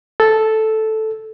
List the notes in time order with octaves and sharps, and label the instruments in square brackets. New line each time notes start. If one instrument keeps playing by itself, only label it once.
[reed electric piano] A4